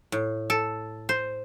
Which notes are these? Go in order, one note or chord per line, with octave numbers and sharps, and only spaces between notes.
A2
A4
C5